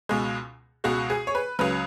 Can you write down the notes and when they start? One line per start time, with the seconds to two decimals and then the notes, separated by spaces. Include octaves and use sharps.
0.09 C#2 B2 G#3
0.84 C#2 B2 G#3 F#4
1.10 G#4
1.27 C#5
1.35 B4
1.59 C#2 C#3 F#3 B4